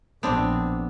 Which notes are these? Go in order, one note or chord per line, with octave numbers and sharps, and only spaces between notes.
A#1 B3 C4 D4